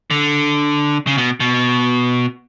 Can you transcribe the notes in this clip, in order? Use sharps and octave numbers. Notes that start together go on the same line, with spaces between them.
D3
C#3
B2
B2